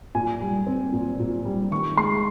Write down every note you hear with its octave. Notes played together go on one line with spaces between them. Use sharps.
A#2 G#5
G3
C4
A#2
A#2
G3
D#3 C#6
G#3 C6